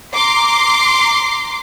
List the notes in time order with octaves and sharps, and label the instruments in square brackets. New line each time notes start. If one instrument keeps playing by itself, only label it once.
[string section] A#5 C6 D6